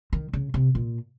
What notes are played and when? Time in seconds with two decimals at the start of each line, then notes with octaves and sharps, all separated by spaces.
0.13 D#3
0.33 C#3
0.54 C3
0.75 A#2